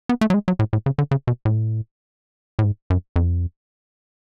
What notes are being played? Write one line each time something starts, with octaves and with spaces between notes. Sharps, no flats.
B3
A3
F#3
G#3
F#3
A2
A2
C#3
D3
C#3
B2
A2
A2
G#2
F#2
F2